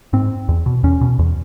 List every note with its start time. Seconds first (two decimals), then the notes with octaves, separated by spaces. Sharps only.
0.13 G#2 C4
0.49 E2
0.66 B2
0.84 E2 C#4
1.01 B2
1.19 E2